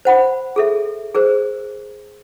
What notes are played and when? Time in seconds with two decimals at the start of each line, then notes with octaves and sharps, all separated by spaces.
0.05 C5 F#5 B5
0.56 G#4 A4 E5
1.15 G#4 A#4 C5